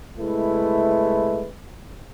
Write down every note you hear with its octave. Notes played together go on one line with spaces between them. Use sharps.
C2 G#3 A3 E4 B4